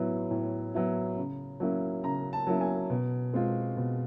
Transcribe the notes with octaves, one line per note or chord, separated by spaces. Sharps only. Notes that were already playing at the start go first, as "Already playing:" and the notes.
Already playing: A2 F#3 B3 E4
A2
F#3 B3 E4
C#3
F#3 A#3 C#4 E4
C#3 A#5
A5
F#3 A#3 C#4 E4
G#5
B2
G#3 C4 F4
B2